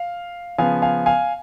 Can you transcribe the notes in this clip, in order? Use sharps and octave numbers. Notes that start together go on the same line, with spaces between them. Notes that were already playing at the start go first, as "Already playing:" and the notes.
Already playing: F5
C#3 F3 B3 F5 G#5
F5 G#5
F5 G#5